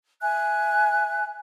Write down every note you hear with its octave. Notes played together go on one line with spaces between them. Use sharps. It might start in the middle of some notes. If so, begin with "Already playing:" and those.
E5 G#5 F#6